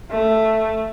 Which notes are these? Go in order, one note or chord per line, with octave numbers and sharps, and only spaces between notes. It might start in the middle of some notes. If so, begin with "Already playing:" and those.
A3